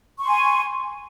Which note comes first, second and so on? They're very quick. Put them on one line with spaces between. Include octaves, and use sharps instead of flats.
C#6 C6 G#5